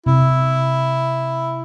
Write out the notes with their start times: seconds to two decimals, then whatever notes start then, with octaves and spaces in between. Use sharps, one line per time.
0.06 C3 E4